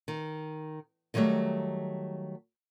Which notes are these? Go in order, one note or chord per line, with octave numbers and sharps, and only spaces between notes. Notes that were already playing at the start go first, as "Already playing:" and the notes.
D#3
D3 D#3 F#3 G3 A3